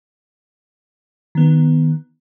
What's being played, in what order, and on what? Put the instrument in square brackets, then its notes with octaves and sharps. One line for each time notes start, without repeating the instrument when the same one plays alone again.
[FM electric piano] D#3 B3